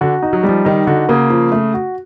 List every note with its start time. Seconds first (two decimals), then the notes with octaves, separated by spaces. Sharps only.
0.01 D3 F#4
0.22 D#4
0.33 F#3
0.43 G3
0.49 F3
0.65 D#3 D#4
0.87 D3 F#4
1.09 C#3 A#3
1.30 F3
1.52 A3
1.74 F#4